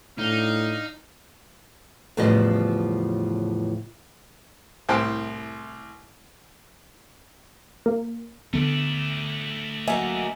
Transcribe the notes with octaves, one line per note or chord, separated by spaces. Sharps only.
A2 D4 D#4 F5
E2 A2 C#3 F3 G3 D#5
C2 A2 C5 G5 A5
A#3
D3 A3 B3 D4
F#3 A#3 D#5 E5 G#5